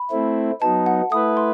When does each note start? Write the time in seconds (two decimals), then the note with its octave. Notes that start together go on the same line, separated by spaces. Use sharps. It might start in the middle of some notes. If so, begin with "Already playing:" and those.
Already playing: B5
0.11 A3 C4 E4
0.61 F#3 B3 D#4 A5
0.86 F#5
1.12 A3 E4 B4 D#6
1.37 C6